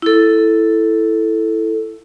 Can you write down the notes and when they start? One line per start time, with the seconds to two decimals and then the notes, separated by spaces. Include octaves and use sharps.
0.02 E4 A4